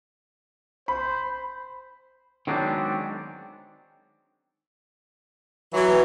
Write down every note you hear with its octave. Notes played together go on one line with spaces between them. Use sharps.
C5 B5
D#3 F#3 G#3 B3 C4 D4
E3 F#3 B4